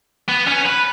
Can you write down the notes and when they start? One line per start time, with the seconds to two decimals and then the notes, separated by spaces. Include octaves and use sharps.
0.28 B3
0.47 C#4
0.65 B4